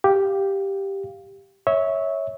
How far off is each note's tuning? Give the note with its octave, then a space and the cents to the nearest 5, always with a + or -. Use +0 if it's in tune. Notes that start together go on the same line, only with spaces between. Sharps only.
G4 +0 F5 +0
C#5 +0 E5 -25